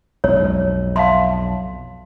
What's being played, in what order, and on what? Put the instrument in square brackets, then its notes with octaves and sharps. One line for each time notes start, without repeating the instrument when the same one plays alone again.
[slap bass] B1 F2 [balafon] G#3 [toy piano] C#5
[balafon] C#5 E5 A5 [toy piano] F5 C6